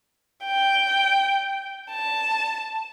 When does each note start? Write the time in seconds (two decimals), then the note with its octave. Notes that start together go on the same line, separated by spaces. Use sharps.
0.44 G5
1.92 A5